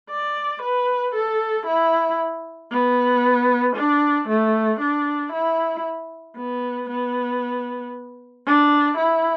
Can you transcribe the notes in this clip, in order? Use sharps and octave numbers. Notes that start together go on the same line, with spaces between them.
D5
B4
A4
E4
B3
D4
A3
D4
E4
B3
B3
D4
E4